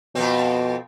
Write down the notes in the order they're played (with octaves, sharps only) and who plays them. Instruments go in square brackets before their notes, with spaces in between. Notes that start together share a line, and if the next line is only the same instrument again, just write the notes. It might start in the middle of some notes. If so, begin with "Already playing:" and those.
[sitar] F2 C4 [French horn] B2